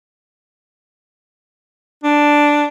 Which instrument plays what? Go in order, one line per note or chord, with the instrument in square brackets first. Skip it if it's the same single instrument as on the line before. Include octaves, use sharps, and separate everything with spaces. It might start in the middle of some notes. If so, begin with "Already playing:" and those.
[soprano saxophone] D4